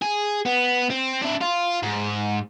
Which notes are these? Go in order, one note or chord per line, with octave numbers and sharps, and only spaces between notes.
G#4
B3
C4
D4 E4
F4
G#2